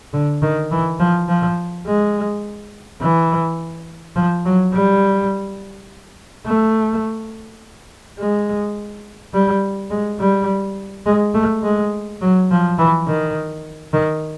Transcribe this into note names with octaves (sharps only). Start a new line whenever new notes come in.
D3
D#3
E3
F3
F3
G#3
E3
F3
F#3
G3
A3
G#3
G3
G#3
G3
G#3
A3
G#3
F#3
F3
E3
D#3
D#3